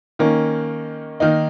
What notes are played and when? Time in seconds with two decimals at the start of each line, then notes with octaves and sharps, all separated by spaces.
0.19 D#3 A#3 C#4
1.20 D#3 A#3 D#4